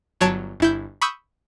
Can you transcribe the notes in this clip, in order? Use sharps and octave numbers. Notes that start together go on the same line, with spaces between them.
G1 F#3 C#5 A5 D7
G1 E4 G6
B5 C#6 D#6 E6 G6